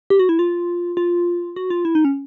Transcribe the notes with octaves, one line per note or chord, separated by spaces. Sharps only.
G4
F#4
E4
F4
F4
F#4
F4
E4
D#4
C#4